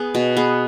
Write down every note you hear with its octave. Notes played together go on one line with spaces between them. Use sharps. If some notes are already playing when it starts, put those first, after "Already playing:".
Already playing: B3 G#4
B2
B3 G#4